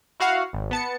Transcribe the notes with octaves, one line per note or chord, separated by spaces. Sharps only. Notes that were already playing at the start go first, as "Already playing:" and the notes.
E4 F#4 F5 F#5
G#1
B3 A5 C#7